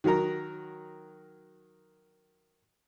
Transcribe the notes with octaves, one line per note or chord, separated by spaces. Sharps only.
D#3 F#3 F#4 A#4 A#5